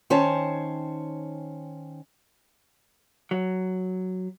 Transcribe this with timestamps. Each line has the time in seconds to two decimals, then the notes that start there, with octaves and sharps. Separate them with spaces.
0.10 D#3 C#4 C5 C#5 A5
3.31 F#3